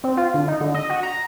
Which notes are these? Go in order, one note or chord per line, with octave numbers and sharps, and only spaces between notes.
C4
F4
D3
D#4
D3
D#5
F#4
A#5